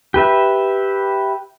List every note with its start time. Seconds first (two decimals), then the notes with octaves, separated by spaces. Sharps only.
0.14 G4 B4 E5